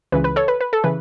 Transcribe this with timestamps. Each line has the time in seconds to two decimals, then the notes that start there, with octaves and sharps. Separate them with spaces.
0.12 C#2 C#3 E3 B4
0.24 B4
0.36 A4 C#5
0.48 B4
0.61 B4
0.73 A4
0.84 C#3 E3 B4